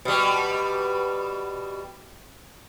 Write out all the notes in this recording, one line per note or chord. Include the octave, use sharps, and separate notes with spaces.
B2 G3